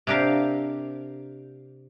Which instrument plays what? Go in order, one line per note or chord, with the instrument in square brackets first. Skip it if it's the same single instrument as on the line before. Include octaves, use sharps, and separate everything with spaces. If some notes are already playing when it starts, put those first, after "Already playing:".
[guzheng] C3 D4 G4 A#4 F5